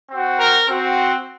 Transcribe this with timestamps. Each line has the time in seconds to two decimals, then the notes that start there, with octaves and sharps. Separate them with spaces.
0.09 C4 F#4
0.39 A#4
0.68 C4 F#4